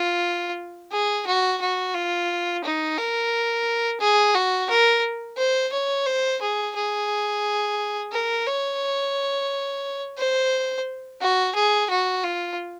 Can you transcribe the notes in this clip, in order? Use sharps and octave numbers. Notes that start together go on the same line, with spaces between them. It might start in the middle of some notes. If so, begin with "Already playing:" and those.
Already playing: F4
G#4
F#4
F#4
F4
D#4
A#4
G#4
F#4
A#4
C5
C#5
C5
G#4
G#4
A#4
C#5
C5
F#4
G#4
F#4
F4